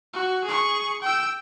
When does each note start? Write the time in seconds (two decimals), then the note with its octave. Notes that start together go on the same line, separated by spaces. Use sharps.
0.14 F#4
0.44 G#4 C#6
1.02 G5 E6